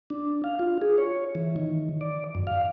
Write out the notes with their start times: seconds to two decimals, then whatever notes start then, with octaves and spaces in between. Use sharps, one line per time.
0.10 D4
0.44 F5
0.59 F4
0.82 G#4
0.98 C#5
1.35 E3
1.56 D#3
2.01 D5
2.35 F#2
2.47 F5